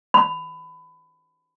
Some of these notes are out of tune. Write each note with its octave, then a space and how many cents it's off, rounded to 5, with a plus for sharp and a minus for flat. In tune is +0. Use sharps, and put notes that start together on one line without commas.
B5 +25